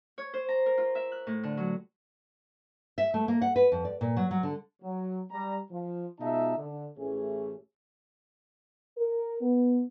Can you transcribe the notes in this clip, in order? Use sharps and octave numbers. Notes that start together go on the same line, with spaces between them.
C#5
C5
A#5
A#4
F4
E5
F#6
A2
D3
F#3
E5
A3
A#3
F#5
B4
F2
D5
A#2
F#3
F#3
D3
F#3
G3 A#5
F3
B2 G#3 D#4 F4 E5 A5
D3
A1 E3 A3 C#4 G#4
A#4
B3